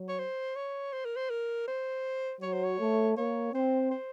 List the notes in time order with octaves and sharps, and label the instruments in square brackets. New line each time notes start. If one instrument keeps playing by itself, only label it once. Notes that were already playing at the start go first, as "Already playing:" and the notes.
Already playing: [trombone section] F#3
[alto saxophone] C#5
C5
C#5
C5
A#4
C5
A#4
C5
[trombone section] F#3 [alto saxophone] C#5
[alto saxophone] C5
C#5
[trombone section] A3
[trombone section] A#3 [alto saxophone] C#5
[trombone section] C4 [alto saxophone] C5
[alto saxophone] C5